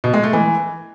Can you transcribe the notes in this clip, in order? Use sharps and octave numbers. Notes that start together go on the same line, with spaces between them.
B2
G#3
A3
E3